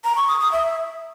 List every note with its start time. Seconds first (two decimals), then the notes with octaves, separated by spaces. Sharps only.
0.04 A#5
0.16 C#6
0.28 D#6
0.40 D#6
0.52 E5